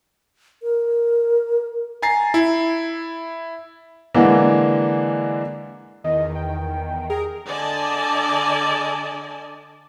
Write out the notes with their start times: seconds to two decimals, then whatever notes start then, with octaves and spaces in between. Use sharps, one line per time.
0.63 A#4
2.02 G#5 A#5 A6 C7
2.34 E4
4.14 D3 E3 G#3 A#3 D4
6.04 E2 D#3 D#5
6.35 G5
7.10 G#4 A#4
7.46 D3 D5 D#5 G#5 A5